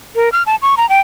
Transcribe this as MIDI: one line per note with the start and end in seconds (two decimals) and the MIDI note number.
0.15 0.32 70
0.32 0.43 89
0.46 0.56 81
0.62 0.75 85
0.77 0.88 82
0.89 1.01 79